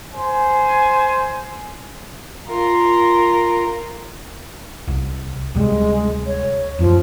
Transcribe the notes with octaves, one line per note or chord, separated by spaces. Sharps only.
C5 G#5
F4 A#4
C2
D2 C3 G3 G#3
C#5
E1 F#2 F3